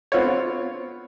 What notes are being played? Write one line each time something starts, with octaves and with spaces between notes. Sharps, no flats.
B3 C4 F4 C#5